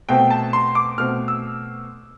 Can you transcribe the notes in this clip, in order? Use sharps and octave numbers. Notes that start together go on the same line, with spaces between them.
B2 A3 C4 G5
A5
C6
D6
B2 A3 C4 F6
E6